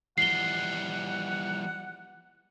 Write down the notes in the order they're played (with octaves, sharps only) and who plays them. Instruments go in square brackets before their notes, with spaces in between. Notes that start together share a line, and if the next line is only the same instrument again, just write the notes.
[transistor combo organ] E3 [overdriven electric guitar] F3 G3 [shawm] F#5 [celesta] C7 G7